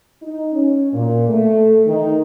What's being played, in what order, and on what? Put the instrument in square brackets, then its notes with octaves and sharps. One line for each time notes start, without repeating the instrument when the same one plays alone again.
[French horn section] D#4
C#4
A#2
A3
D#3